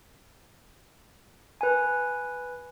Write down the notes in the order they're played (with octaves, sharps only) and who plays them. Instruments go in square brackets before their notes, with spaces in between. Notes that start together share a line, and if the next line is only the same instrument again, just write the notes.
[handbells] B4 G#5